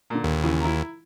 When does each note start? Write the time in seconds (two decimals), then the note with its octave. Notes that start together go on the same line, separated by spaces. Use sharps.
0.10 A#2 D3
0.24 D#2
0.43 C#3 E3
0.60 E4 A#5